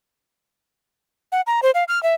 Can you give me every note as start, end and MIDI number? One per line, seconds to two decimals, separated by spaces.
1.32 1.41 78
1.47 1.60 82
1.63 1.71 72
1.75 1.84 77
1.88 2.01 89
2.03 2.15 76